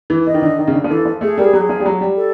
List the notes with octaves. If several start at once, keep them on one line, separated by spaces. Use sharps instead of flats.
E3
E3 D#5
D#3
D3
D#3
C#3
D3
F3
E3 A4
F3
A3 G#4
G3 A#4
G#4
F#3 F#4
G#4
F3
G3
F#3
G3
A4